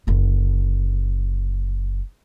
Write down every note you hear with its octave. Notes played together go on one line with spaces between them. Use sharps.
F#1 D3